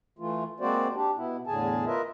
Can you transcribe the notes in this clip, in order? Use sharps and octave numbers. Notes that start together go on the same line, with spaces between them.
E3 A3 F4
G#3 A#3 C4 F#4 C5 D5
D4 G4
B2 B3 E4
E2 A2 D3 G#4 G#5 A5
F4 A#4 B4 D#5 E5